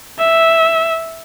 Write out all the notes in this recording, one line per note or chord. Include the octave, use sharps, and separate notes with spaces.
E5